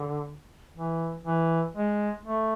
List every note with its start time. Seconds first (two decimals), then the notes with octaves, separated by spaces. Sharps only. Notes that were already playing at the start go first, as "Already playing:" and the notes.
Already playing: D3
0.76 E3
1.26 E3
1.75 G#3
2.26 A3